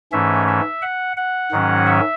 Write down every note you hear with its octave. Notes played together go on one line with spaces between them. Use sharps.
G#2 E3 A3 C#4 E5
E5
F#5
F#5
G#2 D#3 F#3 C#4
E5